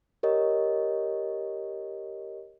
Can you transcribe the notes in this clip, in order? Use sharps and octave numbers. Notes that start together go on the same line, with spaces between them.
G4 A#4 C#5 D#5